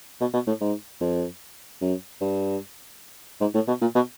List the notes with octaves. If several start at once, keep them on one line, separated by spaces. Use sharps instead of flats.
B2
B2
A2
G#2
F2
F#2
G2
G#2
A2
B2
A#2
B2